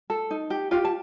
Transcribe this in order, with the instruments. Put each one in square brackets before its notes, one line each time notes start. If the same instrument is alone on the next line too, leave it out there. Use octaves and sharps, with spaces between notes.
[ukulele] A4
D#4
G4
F4 G4 F5
A5